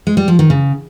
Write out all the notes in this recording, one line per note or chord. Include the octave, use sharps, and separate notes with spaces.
G#3
G3
F3
D#3
C#3